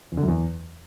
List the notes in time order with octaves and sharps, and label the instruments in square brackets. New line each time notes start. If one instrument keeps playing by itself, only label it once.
[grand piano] E2
D3
F#2
E2